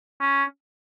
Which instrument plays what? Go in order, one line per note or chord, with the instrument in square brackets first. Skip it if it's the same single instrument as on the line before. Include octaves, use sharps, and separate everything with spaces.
[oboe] C#4